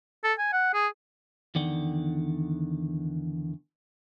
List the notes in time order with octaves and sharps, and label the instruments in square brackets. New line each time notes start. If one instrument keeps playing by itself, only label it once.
[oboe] A4
G#5
F#5
G#4
[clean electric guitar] E2 D3 D#3 D5 F#5 G5